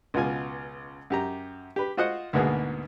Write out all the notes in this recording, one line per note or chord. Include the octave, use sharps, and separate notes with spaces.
C#2 B2 F4 G#5
F#2 G4 A#5
G4 B4
F4 F#4 C5 D#5 F#5
D2 G#2 B2 A#3 B3 G#4